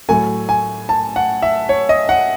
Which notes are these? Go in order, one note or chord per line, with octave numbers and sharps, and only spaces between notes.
A2 F#3 A3 G#5
G#5
A5
F#5
E5
C#5
D#5
F#5